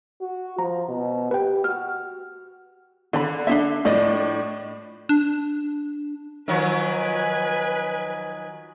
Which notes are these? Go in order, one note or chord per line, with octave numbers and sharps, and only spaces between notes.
F#4
F3 A#5
B2
G4 B4 G5
F#4 F6
D3 D5 B5
D4 D#4 E5
A2 F3 D4 D5 D#5
D4
D#3 F3 F#3 B4 G#5